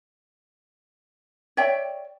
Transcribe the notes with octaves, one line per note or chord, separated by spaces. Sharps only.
C#5 D5 E5 G5